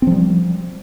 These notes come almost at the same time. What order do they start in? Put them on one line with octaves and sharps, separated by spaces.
C4 F3 G3